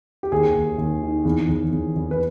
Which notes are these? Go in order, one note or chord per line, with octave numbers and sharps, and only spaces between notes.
G4
D#2 G#4
D#2
D#2
D#3
E2
E2
E2
E2
B4